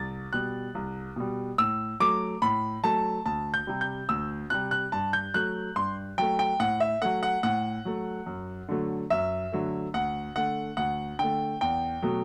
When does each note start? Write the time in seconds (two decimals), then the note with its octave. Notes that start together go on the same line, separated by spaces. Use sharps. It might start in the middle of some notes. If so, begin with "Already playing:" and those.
Already playing: C2 A6
0.33 B2 G3 F#6
0.75 C2
1.16 B2 G3
1.58 A2 E6
2.00 F#3 A3 D6
2.42 A2 B5
2.83 F#3 A3 A5
3.26 D2 A5
3.54 G6
3.67 C3 G3
3.81 G6
4.09 D2 E6
4.50 C3 G3 F#6
4.71 F#6
4.92 G2 A5
5.13 G6
5.34 F#3 A3 F#6
5.76 G2 C6
6.18 F#3 A3 G5
6.39 G5
6.60 A2 F#5
6.80 E5
7.02 F#3 A3 F#5
7.23 F#5
7.43 A2 F#5
7.85 F#3 A3
8.26 F#2
8.68 D3 F#3 A3
9.10 F#2 E5
9.52 D3 F#3 A3
9.94 D2 F#5
10.35 D3 A3 F#5
10.77 D2 F#5
11.19 D3 A3 G5
11.61 E2 G5
12.02 B2 F#3 A3